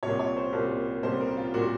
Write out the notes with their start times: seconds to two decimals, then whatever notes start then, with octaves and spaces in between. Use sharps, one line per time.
0.03 C2 A#2 G3 A#3 C#5
0.19 C#5
0.37 C5
0.53 C2 A#2 G3 A#3
1.03 C2 A#2 G3 A#3 C5
1.20 A#4
1.37 F4
1.54 A#2 G3 A#3 F#4